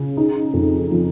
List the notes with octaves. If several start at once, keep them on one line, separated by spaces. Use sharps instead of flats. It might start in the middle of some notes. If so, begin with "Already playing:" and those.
Already playing: C#3
D#4
F2
F3